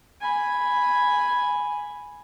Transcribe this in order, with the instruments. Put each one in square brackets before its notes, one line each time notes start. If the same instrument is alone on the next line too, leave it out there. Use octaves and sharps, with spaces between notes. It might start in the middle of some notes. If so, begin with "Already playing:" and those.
[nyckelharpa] G#5 B5